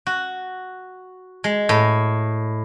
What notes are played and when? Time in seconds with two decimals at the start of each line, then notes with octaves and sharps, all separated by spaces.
0.07 F#4
1.44 G#3
1.69 A2